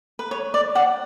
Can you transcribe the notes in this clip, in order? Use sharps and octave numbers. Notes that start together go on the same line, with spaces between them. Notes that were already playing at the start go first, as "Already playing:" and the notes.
B4
C#5
D5
D5 F#5